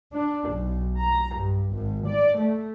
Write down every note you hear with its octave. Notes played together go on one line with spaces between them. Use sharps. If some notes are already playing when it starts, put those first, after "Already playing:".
D4
B1
A#5
G2
G#1
D5
A3